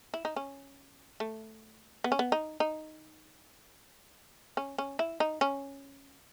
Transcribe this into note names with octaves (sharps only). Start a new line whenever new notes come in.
E4
D#4
C#4
A3
B3
C#4
B3
D#4
D#4
C#4
C#4
E4
D#4
C#4